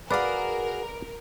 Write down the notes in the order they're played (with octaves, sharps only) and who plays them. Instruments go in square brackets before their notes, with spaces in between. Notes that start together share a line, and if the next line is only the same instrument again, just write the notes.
[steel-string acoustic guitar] F#4 G#4 [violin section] A#4 [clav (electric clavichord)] B4 D5 F5